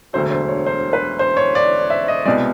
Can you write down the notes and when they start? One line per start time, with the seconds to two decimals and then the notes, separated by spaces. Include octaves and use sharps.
0.13 E1 D2 D3 F#3 C5
0.31 C5
0.48 C#5
0.66 C5
0.93 B4
1.19 C5
1.37 C#5
1.55 D5
1.90 E5
2.08 D#5
2.25 C2 B2 G#3 D5